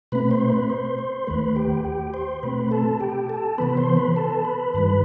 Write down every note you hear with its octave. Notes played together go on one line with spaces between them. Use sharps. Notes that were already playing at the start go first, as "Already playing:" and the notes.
B2 A3 C4 B4 B5
C5 C6
B4 B5
C5 C6
C5 C6
D#2 D#3 A3 B4 B5
G4 G5
G4 G5
C5 C6
B2 A3 C4 B4 B5
A4 A5
G4 G5
A4 A5
C3 E3 B3 B4 B5
C5 C6
B4 B5
A4 A5
B4 B5
G2 D#3 G3